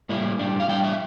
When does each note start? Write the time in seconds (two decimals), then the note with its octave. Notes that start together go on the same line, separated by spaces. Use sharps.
0.09 A2 G3 A#3 E4
0.39 A2 G3 D4
0.60 F5
0.69 A2 G3 D4 G5
0.84 E5